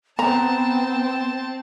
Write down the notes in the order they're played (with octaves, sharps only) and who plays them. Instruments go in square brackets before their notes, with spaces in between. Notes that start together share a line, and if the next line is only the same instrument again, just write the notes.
[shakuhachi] B3 [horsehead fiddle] C4 G5 [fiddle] C5 A5 [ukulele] A#5